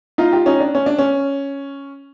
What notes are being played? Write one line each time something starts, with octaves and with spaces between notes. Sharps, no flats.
D#4 F4
F4 G4
C#4 D#4
D4
C#4
D4
C#4